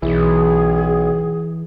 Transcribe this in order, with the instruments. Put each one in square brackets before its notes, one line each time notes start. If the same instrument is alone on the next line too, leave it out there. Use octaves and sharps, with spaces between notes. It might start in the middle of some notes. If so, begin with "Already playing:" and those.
[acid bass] B1 [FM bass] E3 [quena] G#4